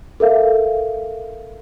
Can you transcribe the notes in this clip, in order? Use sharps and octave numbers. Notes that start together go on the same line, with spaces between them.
A4 A#4 E5 F5